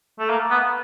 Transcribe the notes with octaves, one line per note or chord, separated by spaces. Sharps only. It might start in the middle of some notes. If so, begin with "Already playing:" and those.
A3
A#3
B3